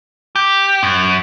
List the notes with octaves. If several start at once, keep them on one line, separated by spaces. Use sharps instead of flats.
G4
F#2